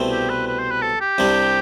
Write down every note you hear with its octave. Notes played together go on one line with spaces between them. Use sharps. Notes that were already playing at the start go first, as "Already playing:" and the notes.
Already playing: C2 B2 A3 C4 E4
G4
B4
B4
C5
B4
A4
G4
C2 C3 G3 D4